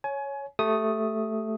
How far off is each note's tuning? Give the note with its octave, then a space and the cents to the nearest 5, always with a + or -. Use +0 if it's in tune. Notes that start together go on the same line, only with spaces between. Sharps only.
C#5 +0 G#5 +25
A3 +0 G4 +0 D#6 +5